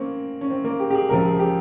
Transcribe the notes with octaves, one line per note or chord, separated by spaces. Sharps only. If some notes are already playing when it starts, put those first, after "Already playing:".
Already playing: A#3 C4 C#4
C#4
C4
A#3
G4
G4
G#4
C#2 C3 F3 A#4
G#4
G4